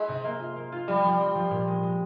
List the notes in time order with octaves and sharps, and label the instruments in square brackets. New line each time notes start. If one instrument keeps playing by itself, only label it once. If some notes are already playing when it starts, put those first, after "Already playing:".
Already playing: [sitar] G#3 [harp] E4
[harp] C3
A#3
F4
A#3
F4
[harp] F3 [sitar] G3
[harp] F3
C4
F3
A#2
G#3
G#3